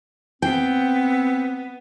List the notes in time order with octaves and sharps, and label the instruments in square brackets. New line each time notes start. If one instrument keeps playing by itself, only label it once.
[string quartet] B3 [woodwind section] C4 [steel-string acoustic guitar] G5